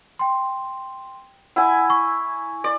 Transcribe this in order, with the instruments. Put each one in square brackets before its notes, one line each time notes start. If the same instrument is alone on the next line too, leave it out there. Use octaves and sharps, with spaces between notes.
[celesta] G5 C6
[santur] E4 G#5 [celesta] F#5
[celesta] C#6
[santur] D5